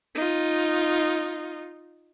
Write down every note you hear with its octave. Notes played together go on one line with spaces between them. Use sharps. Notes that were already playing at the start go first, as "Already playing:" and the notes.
D#4 F4